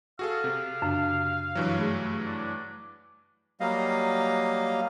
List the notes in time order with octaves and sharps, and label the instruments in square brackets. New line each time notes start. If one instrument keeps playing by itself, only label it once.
[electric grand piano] F#4 G#4 A4 [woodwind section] F5
[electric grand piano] C3 [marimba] A4
[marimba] F#2 C#3 D4
[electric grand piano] G2 E3 F#3
[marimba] A3 G#4
[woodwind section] D4
[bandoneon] F#3 G3 A#3 D#5 F5